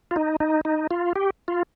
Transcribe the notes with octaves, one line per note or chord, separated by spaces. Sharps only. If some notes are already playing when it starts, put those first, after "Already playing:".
F4
D#4
D#4
D#4
F4
G4
F4